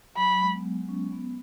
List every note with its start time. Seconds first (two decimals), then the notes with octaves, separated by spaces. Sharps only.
0.17 F#3 B5
0.29 F#3
0.41 G#3
0.53 B3
0.65 B3
0.89 C#4
1.12 B3